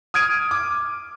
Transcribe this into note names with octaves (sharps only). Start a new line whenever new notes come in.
D#6 F6 G#6 D7 D#7
D6